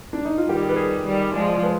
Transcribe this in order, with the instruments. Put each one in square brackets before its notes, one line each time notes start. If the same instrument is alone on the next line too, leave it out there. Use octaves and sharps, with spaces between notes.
[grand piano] D4
D#4
F4
[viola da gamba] D#3 G3 [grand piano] G4
[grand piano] G#4
B4
G#4
[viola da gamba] D#3 G3
[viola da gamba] F3 G#3 [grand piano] D5
[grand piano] D5
B4